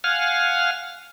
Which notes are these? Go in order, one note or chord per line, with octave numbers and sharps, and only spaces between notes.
F5 F#5 G#5 F6